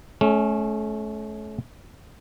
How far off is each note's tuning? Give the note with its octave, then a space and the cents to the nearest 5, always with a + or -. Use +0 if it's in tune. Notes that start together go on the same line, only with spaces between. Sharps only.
A3 -35 C#4 +0